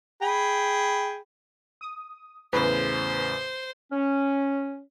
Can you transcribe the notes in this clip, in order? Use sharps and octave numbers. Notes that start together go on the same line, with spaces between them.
G#4 G5 B5
D#6
E2 A2 C#3 B4 C5
C#4